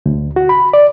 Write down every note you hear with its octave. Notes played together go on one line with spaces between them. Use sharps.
D2
F#4
B5
D5